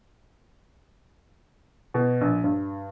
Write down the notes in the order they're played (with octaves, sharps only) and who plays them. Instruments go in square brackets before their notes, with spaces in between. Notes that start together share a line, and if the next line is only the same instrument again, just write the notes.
[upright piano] B2
A#1
G2